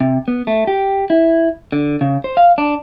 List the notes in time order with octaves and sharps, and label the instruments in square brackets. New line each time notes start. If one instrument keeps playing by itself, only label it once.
[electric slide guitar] C3
B3
A3
G4
E4
D3
C#3
C5
F5
D4